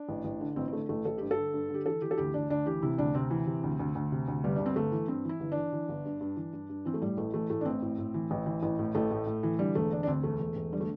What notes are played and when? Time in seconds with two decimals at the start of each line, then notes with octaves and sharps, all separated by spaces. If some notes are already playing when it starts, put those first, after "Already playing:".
Already playing: D4
0.09 A1
0.25 A1
0.41 D3
0.56 A1 C4
0.68 C4
0.73 D3 A3
0.89 A1 A3
1.05 A1 A4
1.18 G2 G4
1.31 A4
1.37 D3
1.54 G2
1.69 D3
1.74 G4
1.86 E3 A4
2.02 E3 G4
2.11 A4
2.18 D2 G4
2.34 D2 D4
2.50 D2 D4
2.66 E3 G4
2.82 C3 E4
2.98 D2 D4
3.15 C3 C4
3.31 E3
3.47 C3
3.63 D2
3.79 D2
3.95 D2
4.12 C3
4.28 D2
4.44 G1 G3
4.56 G1 D4
4.66 C4
4.76 G1 A3
4.92 E3
5.08 G2 C4
5.25 E3 E4
5.40 G1
5.52 E3 D4
5.73 E3
5.89 G1
6.05 G2
6.21 G2
6.37 E3
6.53 G2
6.69 G2
6.85 E3 C4
6.94 A3
7.02 A2 G3
7.17 A1 A3
7.33 E3 A3
7.50 A2 A3
7.61 D4
7.65 A1 C4
7.82 A2
7.98 A2
8.14 E3
8.31 A1
8.46 E3
8.63 A1
8.79 A2
8.95 A1 A3
9.11 A2
9.27 A2
9.43 E3
9.59 D3 G3
9.75 E1 A3
9.91 D3 D4
10.03 D4
10.07 D2 C4
10.24 E1 A3
10.40 E1
10.56 E1
10.72 D3 G3
10.81 A3